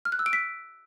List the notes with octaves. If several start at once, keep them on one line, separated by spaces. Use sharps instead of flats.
F6
F#6
E6
D7
B6